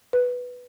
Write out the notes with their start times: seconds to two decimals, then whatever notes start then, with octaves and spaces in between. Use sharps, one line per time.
0.13 B4